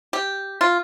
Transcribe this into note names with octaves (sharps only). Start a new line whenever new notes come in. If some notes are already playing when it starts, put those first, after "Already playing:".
G4
F4